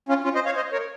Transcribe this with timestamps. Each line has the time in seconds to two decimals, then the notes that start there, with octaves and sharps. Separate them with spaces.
0.09 C#4 F4
0.24 C#4 F4
0.35 C5 D#5
0.46 C#5 F5
0.56 C5 D#5
0.72 A#4 C#5